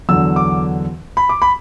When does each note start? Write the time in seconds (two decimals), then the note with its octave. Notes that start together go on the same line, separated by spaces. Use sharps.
0.09 E2 D3 F#3 E6
0.36 D6
1.17 B5
1.29 D6
1.42 B5